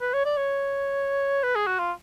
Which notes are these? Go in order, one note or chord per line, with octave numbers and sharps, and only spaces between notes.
B4
C#5
D5
C#5
B4
G#4
F#4
F4